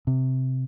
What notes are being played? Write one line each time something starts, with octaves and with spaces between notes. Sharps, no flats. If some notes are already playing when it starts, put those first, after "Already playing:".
C3